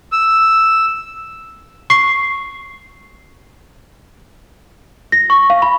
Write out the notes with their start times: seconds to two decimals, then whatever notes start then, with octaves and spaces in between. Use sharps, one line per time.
0.12 E6
1.90 C#6 C7
5.12 A#6
5.30 C#6
5.50 F5
5.62 B5